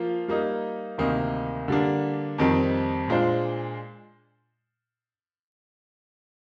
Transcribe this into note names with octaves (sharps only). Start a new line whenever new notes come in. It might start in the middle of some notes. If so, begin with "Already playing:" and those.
Already playing: F3 A#3 F4
G3 A#3 D#4
D2 C3 D#3 A#3 D#4
D3 G3 A#3 D4
F2 D#3 G3 C4 G4
A#2 G#3 D4 F4 C5